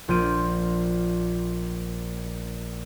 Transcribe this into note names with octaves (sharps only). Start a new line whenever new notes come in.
A#1 F4 G6 D7 D#7